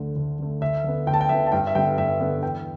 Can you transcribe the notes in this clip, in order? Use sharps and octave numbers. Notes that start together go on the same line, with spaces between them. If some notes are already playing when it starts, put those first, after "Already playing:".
Already playing: D2 D3 A3
D2
D3 A3
D2 E5
D3 B3
D2 G5
A5
G5
D3 B3 E5
A5
G2 G5
E5
D3 G3 B3 G5
G2 E5
D3 G3 B3
E2 G5